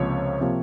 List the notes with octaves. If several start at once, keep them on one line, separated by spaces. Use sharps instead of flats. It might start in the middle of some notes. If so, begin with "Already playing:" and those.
Already playing: C#2 C3 F3 A#3 C#5
C3 F3 A#3